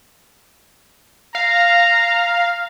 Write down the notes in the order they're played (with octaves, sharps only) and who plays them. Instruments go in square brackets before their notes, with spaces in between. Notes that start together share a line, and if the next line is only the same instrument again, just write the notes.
[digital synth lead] F5 [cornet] A#5